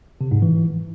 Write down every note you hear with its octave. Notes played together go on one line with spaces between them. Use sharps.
C3
G#2
E3